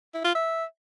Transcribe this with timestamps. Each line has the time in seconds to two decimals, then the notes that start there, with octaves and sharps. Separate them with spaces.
0.14 E4
0.25 F4
0.35 E5